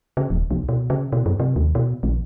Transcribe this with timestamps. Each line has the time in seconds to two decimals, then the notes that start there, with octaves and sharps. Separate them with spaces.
0.17 C#3
0.30 D#1
0.51 C2
0.69 B2
0.90 C#3
1.13 B2
1.26 F#2
1.40 C3
1.56 D#2
1.75 B2
2.03 A#1